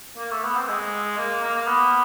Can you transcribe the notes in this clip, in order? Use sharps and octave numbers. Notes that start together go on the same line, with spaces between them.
A#3
A3
B3
C4
G#3
A#3
A#3
A#3
B3